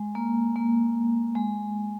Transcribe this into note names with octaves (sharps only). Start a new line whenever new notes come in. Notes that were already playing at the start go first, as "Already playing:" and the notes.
Already playing: G#3
A#3
A#3
G#3